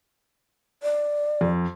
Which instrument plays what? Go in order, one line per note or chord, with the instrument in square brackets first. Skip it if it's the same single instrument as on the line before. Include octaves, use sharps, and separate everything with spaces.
[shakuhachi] D5
[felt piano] F2